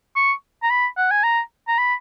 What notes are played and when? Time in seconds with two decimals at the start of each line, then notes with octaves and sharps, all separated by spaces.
0.16 C#6
0.63 A#5
0.70 B5
0.97 F#5
1.11 G#5
1.24 A#5
1.68 A#5
1.78 B5